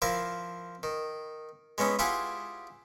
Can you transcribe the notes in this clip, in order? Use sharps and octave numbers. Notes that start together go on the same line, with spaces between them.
F3 E4 A#4 F5
D#3
G#3 B3 C#4 E4
E4 F4 G4 G#4 F#5 G#5